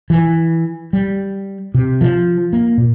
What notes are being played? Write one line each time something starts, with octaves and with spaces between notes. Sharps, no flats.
E3
G3
C3
F3
A#3
A#2